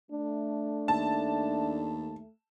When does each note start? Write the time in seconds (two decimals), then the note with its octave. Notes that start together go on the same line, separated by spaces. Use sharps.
0.12 A3 D4
0.88 D#2 A5